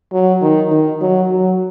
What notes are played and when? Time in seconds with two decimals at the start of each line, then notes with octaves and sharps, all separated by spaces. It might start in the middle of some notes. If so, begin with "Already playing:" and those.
0.12 F#3
0.41 D#3
0.71 D#3
1.01 F#3
1.31 F#3